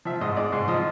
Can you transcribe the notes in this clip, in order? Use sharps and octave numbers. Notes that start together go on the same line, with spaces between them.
F3 E5
G#2 D#5
G#3 D5
G#2
F3 D#5